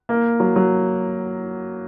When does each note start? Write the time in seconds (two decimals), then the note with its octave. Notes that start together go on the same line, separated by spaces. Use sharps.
0.09 A#3
0.40 F#3
0.56 F#3